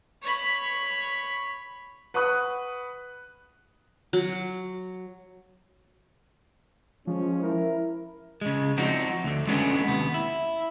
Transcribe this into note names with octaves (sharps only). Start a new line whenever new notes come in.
C#5 B5
B4 F#5 B5 C#6 D#6 F#6
F#3
F3 G#3 C#4
E4 A#4
C#3 G#3
F3 C4 D4 D#4 F#4
D2 D3
G#3 B3 C#4 D4 A4
D#2 C3 B3
E4